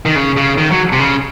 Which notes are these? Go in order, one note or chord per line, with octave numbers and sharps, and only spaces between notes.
D#3
C#3
C#3
D#3
F#3
C3
C#3